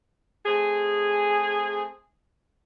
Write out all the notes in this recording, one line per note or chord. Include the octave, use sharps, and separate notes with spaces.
A3 C4 G#4